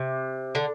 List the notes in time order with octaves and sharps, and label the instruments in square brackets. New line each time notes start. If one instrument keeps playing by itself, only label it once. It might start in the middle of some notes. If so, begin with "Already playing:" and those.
Already playing: [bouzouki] C3
D3